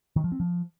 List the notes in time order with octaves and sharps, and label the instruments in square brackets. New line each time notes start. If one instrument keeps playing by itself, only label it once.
[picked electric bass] D#3
F3
C4
F3